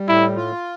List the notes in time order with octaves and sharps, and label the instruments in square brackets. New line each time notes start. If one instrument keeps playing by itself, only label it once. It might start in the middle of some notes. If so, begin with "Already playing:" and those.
Already playing: [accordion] G3
[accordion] A2 [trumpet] E4
[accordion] F4